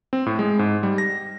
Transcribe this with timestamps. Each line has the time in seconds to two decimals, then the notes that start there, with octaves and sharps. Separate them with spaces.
0.13 C4
0.26 A2
0.39 G#3
0.59 G#2
0.83 G3
0.98 A#6